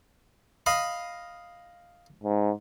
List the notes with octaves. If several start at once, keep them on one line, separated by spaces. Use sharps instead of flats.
D#5 F5 B5
G#2